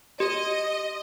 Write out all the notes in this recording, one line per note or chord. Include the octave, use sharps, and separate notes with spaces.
G4 D#5